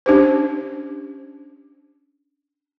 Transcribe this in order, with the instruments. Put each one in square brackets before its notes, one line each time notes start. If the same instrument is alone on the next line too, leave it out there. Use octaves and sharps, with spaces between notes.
[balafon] C#4 D4 G4 C5